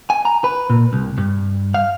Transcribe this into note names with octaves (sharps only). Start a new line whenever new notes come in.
G#5
A#5
B4
A#2
C2
G2
F5